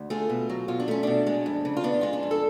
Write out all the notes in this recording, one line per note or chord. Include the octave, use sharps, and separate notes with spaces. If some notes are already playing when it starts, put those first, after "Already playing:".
Already playing: D2
A3 F4 G#4
B2
F#3
B2 F4
D4
A3 C#4
B2 D4
G#3
F2
C#3
F4
B3 D4
G#3 F4
D4
F2
A4